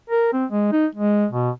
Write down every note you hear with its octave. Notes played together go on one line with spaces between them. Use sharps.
A#4
C4
G#3
D#4
G#3
B2